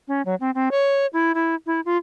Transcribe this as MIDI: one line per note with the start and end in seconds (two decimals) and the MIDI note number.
0.08 0.22 61
0.26 0.35 54
0.40 0.51 60
0.55 0.69 60
0.71 1.06 73
1.13 1.32 64
1.35 1.55 64
1.66 1.80 64
1.85 1.97 65